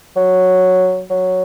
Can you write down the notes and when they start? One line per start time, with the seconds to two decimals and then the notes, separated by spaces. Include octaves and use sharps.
0.16 F#3
1.10 F#3